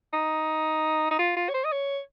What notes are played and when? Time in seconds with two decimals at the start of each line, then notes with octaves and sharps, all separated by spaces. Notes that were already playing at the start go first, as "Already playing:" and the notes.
0.13 D#4
1.11 D#4
1.19 F4
1.37 F4
1.49 C#5
1.54 C5
1.65 D#5
1.72 C#5